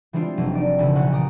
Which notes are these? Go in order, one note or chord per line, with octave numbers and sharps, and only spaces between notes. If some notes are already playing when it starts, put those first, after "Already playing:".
E3 G3 G#3 C4 D4 F4
F1 F#3
D#4 D5
E1 C#3 E3
A#1 F#5 C#6 F#6 A6
G4 A#5 D6 D#6